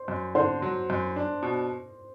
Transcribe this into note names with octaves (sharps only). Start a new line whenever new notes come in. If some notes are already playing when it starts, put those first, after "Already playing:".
Already playing: C5
F#2
D3 C5
F#3
F#2
D4
B2